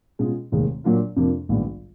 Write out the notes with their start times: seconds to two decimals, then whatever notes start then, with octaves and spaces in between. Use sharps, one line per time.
0.19 B2 G#3 C#4 F4 G#4
0.52 F1 D#2 D#3 G#3
0.84 A#2 F#3 A#3 D4 F4
1.16 F2 C3 F3 A#3 D4
1.49 A#1 G#2 D#3 G3 B3